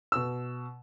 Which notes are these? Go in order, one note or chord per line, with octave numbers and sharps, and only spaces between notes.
B2 E6